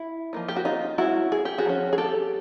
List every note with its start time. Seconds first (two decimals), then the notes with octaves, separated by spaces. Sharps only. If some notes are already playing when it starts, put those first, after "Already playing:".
Already playing: E4
0.33 F3 A#3 D#4
0.48 G4
0.56 F#4
0.65 D#4 F4
0.98 G#3 C#4 E4 F#4
1.32 G#4
1.45 G4
1.58 F#4 G#4
1.66 F3 A#3 C#4
1.93 G#4
1.98 G4 A4